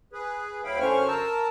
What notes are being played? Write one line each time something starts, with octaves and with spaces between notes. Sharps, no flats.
G#4 B4
D2 F#3 E4 F5 G5 B5
F#2 D3 C#4 C5 C#6 F6
A#4 A5 E6